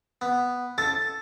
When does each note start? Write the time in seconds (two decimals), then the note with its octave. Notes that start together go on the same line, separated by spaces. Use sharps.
0.21 B3
0.78 A4 A6